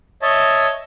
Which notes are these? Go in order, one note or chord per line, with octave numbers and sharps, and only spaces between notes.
C#5 D#5 E5 A5